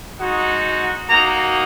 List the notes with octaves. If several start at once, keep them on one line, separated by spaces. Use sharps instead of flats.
G#3 D#4 F#4
A#3 D#4 F#4 A#5